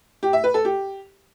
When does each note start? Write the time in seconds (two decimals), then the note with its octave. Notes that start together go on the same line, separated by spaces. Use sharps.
0.23 G4
0.33 E5
0.44 B4
0.54 A4
0.65 G4